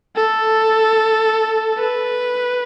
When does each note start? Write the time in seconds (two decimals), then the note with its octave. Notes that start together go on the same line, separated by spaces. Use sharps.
0.16 A4
1.78 B4